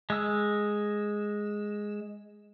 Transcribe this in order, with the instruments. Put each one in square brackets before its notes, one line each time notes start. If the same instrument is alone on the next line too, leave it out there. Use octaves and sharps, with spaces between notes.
[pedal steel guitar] G#3 E6